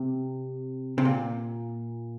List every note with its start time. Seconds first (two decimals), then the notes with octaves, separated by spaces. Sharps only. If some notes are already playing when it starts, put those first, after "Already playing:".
Already playing: C3
0.98 C3
1.05 A#2